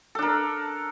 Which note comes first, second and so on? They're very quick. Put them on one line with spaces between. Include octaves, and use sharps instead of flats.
A4 D4 A#4